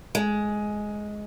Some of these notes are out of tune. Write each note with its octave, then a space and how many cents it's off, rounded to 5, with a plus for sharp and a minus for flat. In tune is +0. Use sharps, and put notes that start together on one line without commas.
G#3 +10